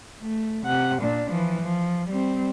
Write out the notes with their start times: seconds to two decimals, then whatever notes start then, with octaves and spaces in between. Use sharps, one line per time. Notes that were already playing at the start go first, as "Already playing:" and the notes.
0.22 A3
0.66 C3 F#5
1.03 A#2 D4
1.31 E3 F3
1.62 F3
2.09 G3 C4